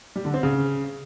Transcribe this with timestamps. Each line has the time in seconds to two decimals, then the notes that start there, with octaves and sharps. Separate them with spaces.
0.16 G3
0.25 D3
0.34 C4
0.43 C#3